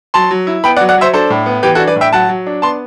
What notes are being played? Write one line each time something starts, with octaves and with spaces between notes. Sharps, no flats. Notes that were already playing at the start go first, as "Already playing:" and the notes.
F#3 A5 C6
F#3
E4
B3 G5 B5
D5 F#5
F#3
D5 F#5
F#3 C5 E5
D4 A4 C5
A2
B3
E3 G4 B4
F#4 A4
D4
B4 D5
A2
E5 G5
F#3 F#5 A5
F#3
D4
B3 A5 C6